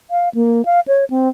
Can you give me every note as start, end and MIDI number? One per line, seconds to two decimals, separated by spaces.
0.11 0.29 77
0.34 0.65 58
0.65 0.80 77
0.88 1.05 73
1.10 1.29 60